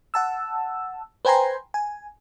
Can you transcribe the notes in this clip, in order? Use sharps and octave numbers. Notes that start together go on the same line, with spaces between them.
F#5 A5 E6
B4 C5 G5 G#5 A#5 C6
G#5